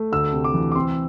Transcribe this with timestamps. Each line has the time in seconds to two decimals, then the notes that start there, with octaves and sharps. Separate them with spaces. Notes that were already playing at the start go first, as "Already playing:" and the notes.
Already playing: A3
0.12 D2 E6
0.33 C3
0.44 D6
0.54 E3
0.72 D6
0.75 C4 C6